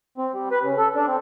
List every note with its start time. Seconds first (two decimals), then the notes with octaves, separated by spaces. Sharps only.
0.18 C4
0.34 G3
0.51 B4
0.63 C#3
0.78 A4
0.95 D4
1.07 C4